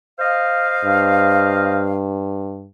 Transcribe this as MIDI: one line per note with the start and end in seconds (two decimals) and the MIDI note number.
0.19 1.96 72
0.19 1.96 75
0.19 1.96 77
0.85 2.67 43